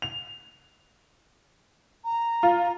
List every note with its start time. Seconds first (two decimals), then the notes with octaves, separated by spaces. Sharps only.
0.02 F7
2.04 A#5
2.43 F4